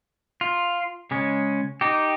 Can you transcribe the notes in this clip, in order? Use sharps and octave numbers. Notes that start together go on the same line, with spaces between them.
F4
C#3 G#3 C#4
D#4 G4